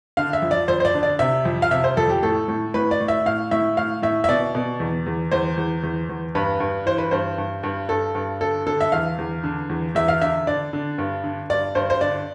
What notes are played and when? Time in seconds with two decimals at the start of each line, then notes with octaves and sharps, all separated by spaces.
0.17 D3 F5
0.33 E5
0.42 F2
0.51 D5
0.68 F2 C5
0.80 C5
0.85 D5
0.94 D3
1.03 D5
1.19 C3 E5
1.45 F2
1.62 F5
1.71 C3 E5
1.84 C5
1.97 F2 A4
2.10 G4
2.23 A2 A4
2.48 A2
2.74 A2 B4
2.91 D5
3.00 A2
3.08 E5
3.26 A2 F5
3.51 A2 E5
3.77 A2 F5
4.03 A2 E5
4.24 E5
4.29 B2 D5
4.55 B2
4.80 E2
5.06 E2
5.31 E2 C5
5.57 E2
5.83 E2
6.09 E2
6.35 G2 B4
6.60 G2
6.86 E3 C5
6.98 B4
7.11 G2 C5
7.38 G2
7.63 G2
7.89 G2 A4
8.15 G2
8.41 D3 A4
8.66 D3 A4
8.81 E5
8.92 E2 F5
9.18 E2
9.44 D3
9.69 E2
9.95 E2 E5
10.08 F5
10.21 D3 E5
10.47 D3 D5
10.73 D3
10.98 G2
11.24 D3
11.50 G2 D5
11.75 G2 C5
11.90 C5
12.01 D3 D5